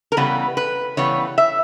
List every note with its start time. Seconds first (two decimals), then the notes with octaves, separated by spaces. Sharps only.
0.12 A#4
0.17 C#3 E3 G3 B3 B4
0.57 B4
0.97 C#3 E3 G3 B3 C#5
1.38 E5